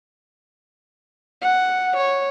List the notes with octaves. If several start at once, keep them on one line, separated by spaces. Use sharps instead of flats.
F#5
C#5